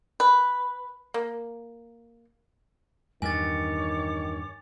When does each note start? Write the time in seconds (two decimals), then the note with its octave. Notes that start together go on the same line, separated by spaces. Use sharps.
0.20 B4
1.14 A#3
3.22 E2 G2 D#3 C#5 G#5 D6 A6